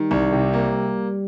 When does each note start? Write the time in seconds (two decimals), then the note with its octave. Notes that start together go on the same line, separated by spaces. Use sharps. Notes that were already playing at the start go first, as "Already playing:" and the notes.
Already playing: D#3 G3
0.11 C2
0.32 C3
0.53 A#3